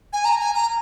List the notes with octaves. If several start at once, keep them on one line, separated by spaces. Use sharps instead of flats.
G#5
A#5
G#5
A#5